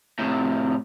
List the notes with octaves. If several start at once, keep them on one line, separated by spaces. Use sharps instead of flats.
A2 C3